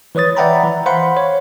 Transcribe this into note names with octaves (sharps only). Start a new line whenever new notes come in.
E3 B4 C#5 D#6 A6
D5 E5 F#5 G5 A#5 B5
E3
C5 F5 F#5 B5 C6
C#5